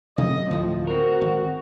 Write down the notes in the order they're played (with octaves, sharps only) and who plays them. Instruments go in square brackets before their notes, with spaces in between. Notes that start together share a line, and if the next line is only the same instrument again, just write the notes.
[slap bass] C3 F#3 A3 [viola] D#5
[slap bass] D2 A2 D3 [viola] F3
[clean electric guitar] C4 A#4 [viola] F#4
[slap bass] G#1